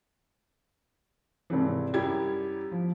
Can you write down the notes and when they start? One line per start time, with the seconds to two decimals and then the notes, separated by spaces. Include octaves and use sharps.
1.50 G#1 C3 E3
1.94 F#2 G3 E4 G4 G#6
2.72 F3